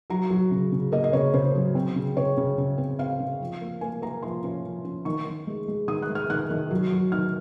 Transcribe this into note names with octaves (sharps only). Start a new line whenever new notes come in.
F#3 A#5
F#3
C#3
C#3
A#3 D#5
D#5
C#3 C#5
C#3 C5
F#3
C4
C#3
C#3 C#5
C#3
C#3
C4
C4 F5
C#3
F3
A#3
A#3 G#5
A#3 A#5
F3 C6
C#4
F3
C#4
D#3 C#6
D#3
G#3
G#3
D#3 D#6
F#6
G#3
F6
D#3 F#6
D#3
F#3
F#3
D#3 F6